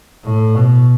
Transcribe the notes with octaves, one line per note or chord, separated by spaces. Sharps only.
A2
B2